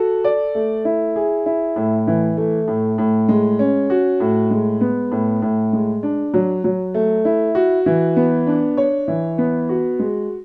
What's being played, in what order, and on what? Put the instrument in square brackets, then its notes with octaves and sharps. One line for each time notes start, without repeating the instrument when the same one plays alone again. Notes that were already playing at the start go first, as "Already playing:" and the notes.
Already playing: [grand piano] F#4 A4
D5
A3
E4
G#4
E4
A2
E3
A3
A2
A2
G#3
C#4
F#4
A2
G#3
B3
A2
A2
G#3
D4
F#3
F#3
A3
E4
F#4
E3
B3
D4
C#5
E3
B3
F#4
G#3